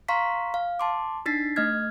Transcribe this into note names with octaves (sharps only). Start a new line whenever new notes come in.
F5 A#5 C6 C#6 B6
F5
A5 C6 D6
D4 D#4 A6 B6 C7
A3 D#5 F6 G#6